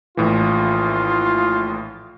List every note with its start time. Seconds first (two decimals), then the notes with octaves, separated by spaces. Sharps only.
0.17 A#1 A2 E3 F4